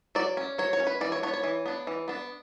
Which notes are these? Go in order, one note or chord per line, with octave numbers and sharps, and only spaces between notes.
F#3 D5
C#4
F#3 C#5
C#5
C#4
B4
E3 D5
C#5
B3 D4 C#5
C#5
E3
B3 D4
E3
B3 D4